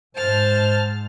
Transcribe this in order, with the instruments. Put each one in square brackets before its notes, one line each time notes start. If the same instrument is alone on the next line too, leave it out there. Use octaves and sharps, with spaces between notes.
[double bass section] G#2 [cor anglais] C5 [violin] A5 F6